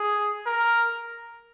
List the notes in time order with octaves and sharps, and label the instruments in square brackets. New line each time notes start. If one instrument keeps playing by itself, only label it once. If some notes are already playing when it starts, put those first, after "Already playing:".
Already playing: [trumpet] G#4
A#4